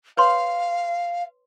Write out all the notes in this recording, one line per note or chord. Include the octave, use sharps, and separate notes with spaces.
B4 C#5 F5 C6